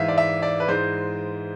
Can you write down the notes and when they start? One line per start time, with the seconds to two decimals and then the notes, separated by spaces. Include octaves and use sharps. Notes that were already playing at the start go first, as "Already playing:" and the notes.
Already playing: G#2 E3 G#3 E5 F5
0.08 D5
0.18 E5
0.42 D5
0.60 B4
0.68 G#2 E3 G#3 C5